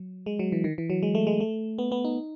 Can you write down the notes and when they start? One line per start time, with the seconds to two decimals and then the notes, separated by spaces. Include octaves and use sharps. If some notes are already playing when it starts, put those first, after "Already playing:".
Already playing: F#3
0.26 G#3
0.39 F#3
0.52 E3
0.64 D#3
0.78 E3
0.90 F#3
1.03 G#3
1.15 A3
1.27 G#3
1.40 A3
1.78 B3
1.92 B3
2.05 D#4